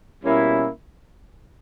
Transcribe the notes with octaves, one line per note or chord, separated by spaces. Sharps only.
B2 G3 A#3 C#4 E4